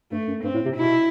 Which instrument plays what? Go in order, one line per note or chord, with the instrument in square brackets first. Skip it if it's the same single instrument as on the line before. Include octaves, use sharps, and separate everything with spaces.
[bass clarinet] G2 [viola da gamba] A3
[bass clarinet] F#2
[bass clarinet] G2 [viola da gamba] C4
[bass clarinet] A2
C3
[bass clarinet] B2 [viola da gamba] E4